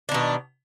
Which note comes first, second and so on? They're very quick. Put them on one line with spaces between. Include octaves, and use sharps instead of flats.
D4 D#3 B2